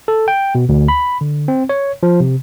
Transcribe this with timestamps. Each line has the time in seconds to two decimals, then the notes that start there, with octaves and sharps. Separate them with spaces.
0.08 A4
0.28 G5
0.55 B2
0.69 D2
0.88 B5
1.21 D3
1.48 C4
1.69 C#5
2.03 F3
2.20 C3